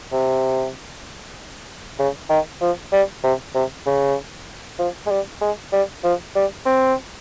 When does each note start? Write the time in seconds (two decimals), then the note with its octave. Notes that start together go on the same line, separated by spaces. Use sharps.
0.12 C3
1.99 C#3
2.30 D#3
2.62 F3
2.93 G3
3.24 C3
3.55 C3
3.86 C#3
4.79 F3
5.07 G#3
5.11 G3
5.41 G#3
5.73 G3
6.04 F3
6.36 G3
6.66 C4